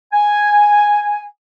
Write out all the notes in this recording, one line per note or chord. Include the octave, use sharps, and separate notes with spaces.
G#5